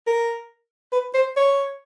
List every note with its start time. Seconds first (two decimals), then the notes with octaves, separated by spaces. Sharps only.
0.07 A#4
0.92 B4
1.14 C5
1.37 C#5